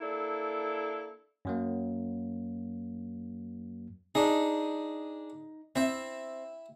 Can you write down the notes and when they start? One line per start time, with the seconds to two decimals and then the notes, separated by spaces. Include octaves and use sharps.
0.01 A#3 D4 E4 A4
1.45 F#2 F#3 A#3
4.15 D4 D#4 G#4
5.76 C4 E4 E5